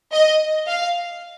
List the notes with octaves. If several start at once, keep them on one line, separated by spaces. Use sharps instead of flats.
D#5
F5